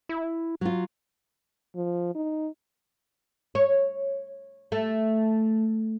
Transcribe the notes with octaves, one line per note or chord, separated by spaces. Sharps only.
E4
F#3 F4
F3
D#4
C#5
A3